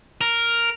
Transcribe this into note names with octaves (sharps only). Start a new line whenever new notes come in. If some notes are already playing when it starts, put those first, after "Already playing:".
A#4